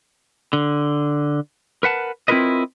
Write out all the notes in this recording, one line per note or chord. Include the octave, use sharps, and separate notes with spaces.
D3
A#4 B4 F#5 A5
C4 E4 F4 A#4 B4 D#5